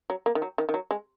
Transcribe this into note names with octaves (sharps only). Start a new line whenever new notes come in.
F#3
A#3
D#3
F#3
D#3
D#3
F#3
G#3